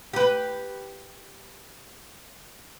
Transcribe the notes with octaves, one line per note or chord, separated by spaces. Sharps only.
G4 B4